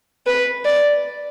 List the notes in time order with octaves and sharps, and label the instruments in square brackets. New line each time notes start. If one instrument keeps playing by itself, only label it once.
[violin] B4
D5